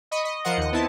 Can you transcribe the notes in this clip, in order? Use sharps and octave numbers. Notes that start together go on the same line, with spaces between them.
D#5 B5 C#6 D#6
D#5
F3 A#4 C5 D#5 F#5 C#7
D#2 D#5
B3 C4 E4 A5